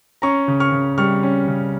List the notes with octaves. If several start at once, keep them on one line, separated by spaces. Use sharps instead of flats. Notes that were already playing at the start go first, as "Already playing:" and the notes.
C#4 A#5 C#6
C#3
C#6 F6
C#3
G3 C#6 F6
C#4
C#3